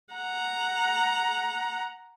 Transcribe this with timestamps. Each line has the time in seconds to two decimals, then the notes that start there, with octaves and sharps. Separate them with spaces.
0.14 F#5 A#5